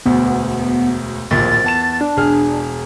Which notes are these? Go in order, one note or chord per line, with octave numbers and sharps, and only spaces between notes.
E1 D2 B3
D1 A#1 D#2 A6
E2 A5 E7
D4
E1 G#4 F6